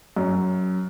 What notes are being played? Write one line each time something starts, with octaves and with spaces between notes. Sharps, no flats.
F#2